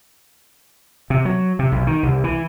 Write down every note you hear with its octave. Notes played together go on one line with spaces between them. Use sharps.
C3
F#3
C3
B1
D#3
C2
E3